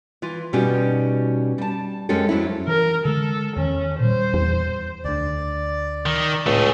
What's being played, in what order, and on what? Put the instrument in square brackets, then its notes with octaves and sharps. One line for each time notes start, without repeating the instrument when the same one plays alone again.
[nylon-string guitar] E3 F4
B2 G3 C#4 D#4 F#4 G4
G3 A5
F#2 G#3 C#4 G4 A4
F2 F#3 C#4 E4
[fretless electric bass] E3 [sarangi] A#4
[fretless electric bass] D3 G#3 [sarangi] A4
[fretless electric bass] E2 D#3 [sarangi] C#4
[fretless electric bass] A#2 G3 [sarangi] C5
[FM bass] E2
[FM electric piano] D2 D3 [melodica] D5
[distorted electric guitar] D#3
[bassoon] C#2 [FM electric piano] A2 G#3 C#6 [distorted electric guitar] A3 G#4